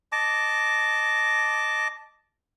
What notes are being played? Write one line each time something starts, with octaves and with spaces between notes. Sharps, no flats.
D#5 A5 D6